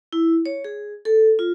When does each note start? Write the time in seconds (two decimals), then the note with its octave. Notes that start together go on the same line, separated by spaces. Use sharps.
0.13 E4
0.46 C#5
0.64 G#4
1.05 A4
1.39 F4